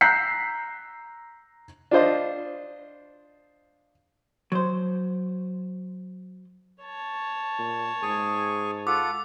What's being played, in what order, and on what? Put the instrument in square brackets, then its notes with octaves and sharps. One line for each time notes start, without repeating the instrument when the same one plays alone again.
[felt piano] A#5 E6 F#6 G6 B6 C7
[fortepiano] D4 F4 C5 D#5
[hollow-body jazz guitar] F#3 C5
[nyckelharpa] C#5 A5
[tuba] A#2
[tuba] G#2 [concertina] G#4 G#5 C#6
[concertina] F4 A4 F#5 [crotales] D6